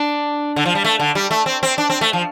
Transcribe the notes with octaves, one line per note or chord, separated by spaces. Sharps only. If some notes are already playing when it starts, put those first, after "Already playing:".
Already playing: D4
D3
F3
G3
A3
D3
G3
A3
C4
C4
D4
C4
A3
F3